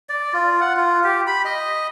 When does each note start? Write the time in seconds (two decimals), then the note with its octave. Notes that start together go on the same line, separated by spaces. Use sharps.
0.09 D5
0.33 F4
0.61 F#5
0.77 F4
1.04 G4
1.27 B5
1.45 D#5